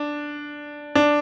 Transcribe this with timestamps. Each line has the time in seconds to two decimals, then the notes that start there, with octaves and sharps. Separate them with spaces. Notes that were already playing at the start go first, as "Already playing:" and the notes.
Already playing: D4
0.95 D4